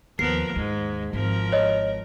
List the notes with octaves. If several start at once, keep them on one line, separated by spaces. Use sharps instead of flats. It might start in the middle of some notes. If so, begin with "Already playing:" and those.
D#2 F3 B3 A#4 C7
D#2 G#2 G#3
G#1 F3 A#4
C#5 D#5